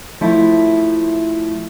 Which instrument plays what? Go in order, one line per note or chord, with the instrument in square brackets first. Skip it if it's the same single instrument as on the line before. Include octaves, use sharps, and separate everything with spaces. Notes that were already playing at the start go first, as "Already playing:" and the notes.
[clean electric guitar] F3 A3 E4